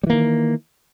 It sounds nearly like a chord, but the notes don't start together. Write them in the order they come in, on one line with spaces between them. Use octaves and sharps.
G3 E3 A#3 D#3